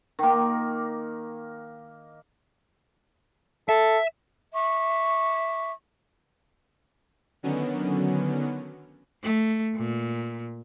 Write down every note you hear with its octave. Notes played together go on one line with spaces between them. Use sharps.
D#3 A#3
A4 E5
E5 C#6 D6
D3 D#3 F#3 B3 C#4
A3
A#2